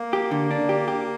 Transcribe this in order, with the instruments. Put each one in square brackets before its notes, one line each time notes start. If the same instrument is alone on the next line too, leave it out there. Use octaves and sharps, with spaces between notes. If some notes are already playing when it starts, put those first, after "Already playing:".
Already playing: [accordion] A#3
[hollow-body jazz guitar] G4
D3
D4
G4
G4